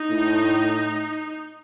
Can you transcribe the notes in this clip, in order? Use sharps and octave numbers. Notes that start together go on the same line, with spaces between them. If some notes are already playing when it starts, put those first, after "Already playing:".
Already playing: D#4
A2